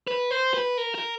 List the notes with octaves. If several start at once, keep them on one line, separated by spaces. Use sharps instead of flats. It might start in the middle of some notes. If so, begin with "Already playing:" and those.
B4
C5
B4
A#4
A#4